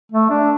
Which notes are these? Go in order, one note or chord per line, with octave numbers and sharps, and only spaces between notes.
A3
D4